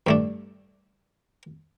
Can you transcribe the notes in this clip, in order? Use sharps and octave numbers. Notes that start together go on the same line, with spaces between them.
G2 A3 D4